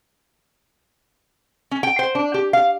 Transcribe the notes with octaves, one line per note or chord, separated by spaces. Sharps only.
C#4
G5
C5
D4
G4
F5